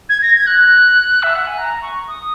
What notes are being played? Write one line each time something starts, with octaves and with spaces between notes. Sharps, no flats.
G#6
A#6
G#6
F#6
E5
F#5
G#5
A#5
C#6
D#6